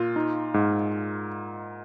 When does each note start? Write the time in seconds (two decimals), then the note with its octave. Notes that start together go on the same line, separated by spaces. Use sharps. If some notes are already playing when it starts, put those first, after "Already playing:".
Already playing: A#2 F4
0.16 D#4
0.54 G#2